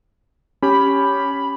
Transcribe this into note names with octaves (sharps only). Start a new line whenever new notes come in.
C#4 G4 B5